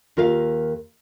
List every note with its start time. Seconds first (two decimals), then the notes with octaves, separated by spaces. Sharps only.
0.17 D#2 F4 A#4 F5